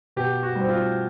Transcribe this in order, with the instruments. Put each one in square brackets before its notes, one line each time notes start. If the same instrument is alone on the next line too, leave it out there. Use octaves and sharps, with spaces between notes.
[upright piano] B2 G4
F#4
G3
C4
F4